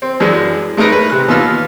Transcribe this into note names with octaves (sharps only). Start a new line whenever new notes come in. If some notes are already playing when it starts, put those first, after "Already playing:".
C4
F#2 E3 G#3 D4
G#3 A3 D#4 A#4 B4
B4
C3 F#6
D#2 B3 D#4 F4 E6 F6